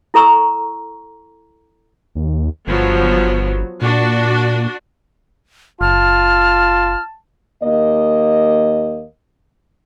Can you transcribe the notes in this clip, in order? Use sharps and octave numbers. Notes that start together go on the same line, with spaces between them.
E4 A4 A#5 C#6 E6
D#2
G1 F3 F#3 B3
A#2 D4 F#4
F#1 F4 A5 F6
D#2 A#3 D#5